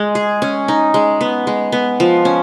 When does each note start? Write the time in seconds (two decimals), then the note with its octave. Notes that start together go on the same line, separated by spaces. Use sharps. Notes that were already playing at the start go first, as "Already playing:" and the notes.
Already playing: G#3
0.15 G#4
0.42 C#4
0.68 D#4
0.94 G#3
1.21 B3
1.47 G#3
1.72 B3
2.00 F3
2.25 C#4